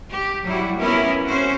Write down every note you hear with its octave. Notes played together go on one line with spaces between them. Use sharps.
G4
F#3 G3 E4 F#4
A#3 B3 C#4 E4 A#4 E5
C#4 F#4 C5